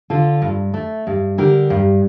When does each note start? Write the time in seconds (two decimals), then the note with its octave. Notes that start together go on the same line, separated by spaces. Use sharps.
0.10 D3 F4 A4
0.42 G2
0.74 A3
1.07 G2
1.38 D3 G4 A#4
1.70 G2